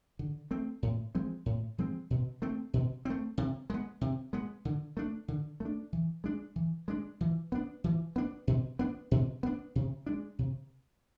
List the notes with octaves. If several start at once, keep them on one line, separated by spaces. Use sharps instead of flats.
D3
A3 C4
A2
F3 G#3 C4
A2
F3 G#3 C4
B2
A3 C4
B2
A3 C4
C3
G#3 B3
C3
G#3 B3
D3
A3 D4
D3
A3
D4
E3
G#3 D4
E3
G#3 D4
E3
B3 D4
E3
B3 D4
B2
B3 D4
B2
B3 D4
C3
G#3 D4
C3